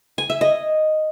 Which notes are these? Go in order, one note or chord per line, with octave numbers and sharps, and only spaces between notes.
G#5
E5
D#5